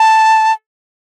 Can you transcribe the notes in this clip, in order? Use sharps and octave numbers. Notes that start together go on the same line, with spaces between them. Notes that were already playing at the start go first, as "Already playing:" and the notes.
Already playing: A5